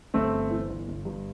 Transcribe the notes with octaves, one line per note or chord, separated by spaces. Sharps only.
G1 A3 C4
G1
E3
G1
G1
G2